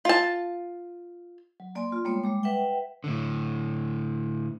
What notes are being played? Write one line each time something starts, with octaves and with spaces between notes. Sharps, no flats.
F4 A5
F#3
A#3 D5 G#5 C6
F4 C6
G3 G#3 A#3 B3 C#5
G3 G#3 D6
B4 E5 F#5 G5
A2 D3